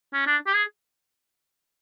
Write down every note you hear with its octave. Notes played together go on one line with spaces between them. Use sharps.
C#4
D4
G4
G#4